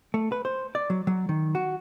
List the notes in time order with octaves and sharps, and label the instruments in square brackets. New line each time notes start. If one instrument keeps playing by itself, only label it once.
[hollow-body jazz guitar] A3
B4
C5
D5
F#3
F#3
D#3
F#4